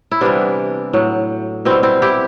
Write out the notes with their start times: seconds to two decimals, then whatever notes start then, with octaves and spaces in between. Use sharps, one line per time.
0.11 E4
0.21 C3 E3 G3 B3 D4
0.93 A2 F#3
1.65 B2 G3 C4 E4
1.83 C4 E4
2.02 E4 G4